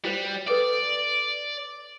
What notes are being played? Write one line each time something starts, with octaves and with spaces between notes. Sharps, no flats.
G3 F#4 C5
A4 B4 D5 D6